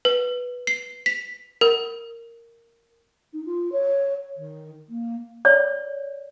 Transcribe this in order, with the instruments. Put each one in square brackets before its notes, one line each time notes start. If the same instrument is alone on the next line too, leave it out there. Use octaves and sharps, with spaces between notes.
[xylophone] B4
C7
B6
A#4
[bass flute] D#4
F4
C#5
D#3
A#3
[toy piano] C#5 D5